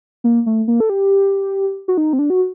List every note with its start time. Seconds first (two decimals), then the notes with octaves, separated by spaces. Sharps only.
0.24 A#3
0.46 A3
0.68 A#3
0.80 A4
0.90 G4
1.88 F#4
1.98 D#4
2.13 C4
2.19 D4
2.30 F#4